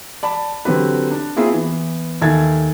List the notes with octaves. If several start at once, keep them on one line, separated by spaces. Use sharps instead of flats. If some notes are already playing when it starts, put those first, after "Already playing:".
D5 A5 B5
D3 F#3 C4 G4 B4
D4
A#3 C4 E4 F4 G#4
E3 B3
D#2 A4 E5 G#5 G#6 A6